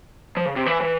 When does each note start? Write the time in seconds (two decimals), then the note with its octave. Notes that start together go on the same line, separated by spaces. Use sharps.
0.37 F3
0.46 C#3
0.56 C3
0.66 E3
0.81 E3